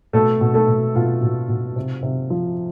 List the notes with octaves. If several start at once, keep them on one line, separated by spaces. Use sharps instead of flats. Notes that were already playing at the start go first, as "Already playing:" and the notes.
B2 A3 A4
B2
A3 A4
B2
B2 F4
B2
B2
C3
C3
F3